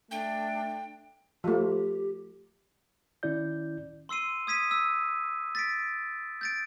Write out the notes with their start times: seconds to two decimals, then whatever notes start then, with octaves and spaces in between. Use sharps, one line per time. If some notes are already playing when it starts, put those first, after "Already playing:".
0.11 A3 D4 G5
1.44 F3 A3 G4
3.23 D#3 C#4 E4 D5 G6
4.09 C6 E6 C7 D#7
4.47 D#6 G#6 B6 D#7
4.71 E6
5.55 A6 B6 D7
6.41 G6 A6 D7